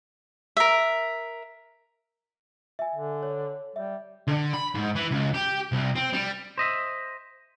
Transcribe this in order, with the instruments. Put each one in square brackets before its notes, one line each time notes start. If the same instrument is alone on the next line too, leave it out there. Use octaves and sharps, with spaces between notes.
[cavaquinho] A#4 E5
[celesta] E5 G#5
[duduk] D3
[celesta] C#5
[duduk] G3 [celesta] E5
[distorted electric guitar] D3
B5
G#2
E3
C#2
G4
C2
C4
G3
[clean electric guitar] C5 D#5 E5